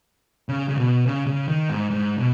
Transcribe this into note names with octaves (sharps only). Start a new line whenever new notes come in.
C#3
C#3
B2
C#3
C#3
D#3
G#2
G#2
B2